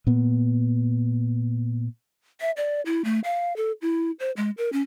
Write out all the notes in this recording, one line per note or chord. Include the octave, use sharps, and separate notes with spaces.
A#2 B3
E5
D5
E4
A3
F5
A4
E4
C5
G#3
A#4
C#4